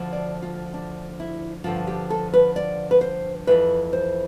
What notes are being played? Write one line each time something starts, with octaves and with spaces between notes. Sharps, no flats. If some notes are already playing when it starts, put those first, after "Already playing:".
Already playing: D2 D3 F3
D5
F4
D4
E4
G2 D3 F3 F4
G4
A4
B4
D5
B4
C5
F2 C3 E3 B4
C5